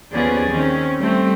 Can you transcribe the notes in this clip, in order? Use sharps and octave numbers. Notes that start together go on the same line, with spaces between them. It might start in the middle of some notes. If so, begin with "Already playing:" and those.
D#2 F3 B3 C#4 G#4 D5
D#3 C4 C#4
G3 A3 C4